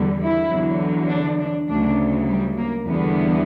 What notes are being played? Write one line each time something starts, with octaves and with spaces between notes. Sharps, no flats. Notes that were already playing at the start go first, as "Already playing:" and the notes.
Already playing: E2 D3 G3
E4
E2 D3 F#3
D4
D4
D2 C#3 F#3 D4
G3
A#3
E2 D3 G3 B3